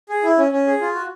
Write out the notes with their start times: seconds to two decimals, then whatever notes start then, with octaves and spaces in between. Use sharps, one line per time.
0.09 G#4
0.23 E4
0.38 C#4
0.52 C#4
0.67 G#4
0.81 F4
0.95 F#4